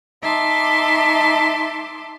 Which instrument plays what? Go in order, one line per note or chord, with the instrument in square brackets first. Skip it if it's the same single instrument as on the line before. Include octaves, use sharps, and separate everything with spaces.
[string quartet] D#4 E5 A5 C6 D6